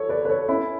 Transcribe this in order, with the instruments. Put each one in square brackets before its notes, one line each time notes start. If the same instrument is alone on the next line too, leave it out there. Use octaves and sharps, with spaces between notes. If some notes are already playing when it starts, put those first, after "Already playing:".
Already playing: [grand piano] A4 C#5
B4 D5
B4
A4 C#5
C#4 E4